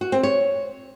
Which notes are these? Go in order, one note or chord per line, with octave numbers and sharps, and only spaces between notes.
F#4
C4
C#5